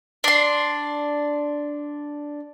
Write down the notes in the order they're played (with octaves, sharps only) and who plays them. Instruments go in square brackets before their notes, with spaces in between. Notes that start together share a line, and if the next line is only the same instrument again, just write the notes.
[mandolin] D4 C6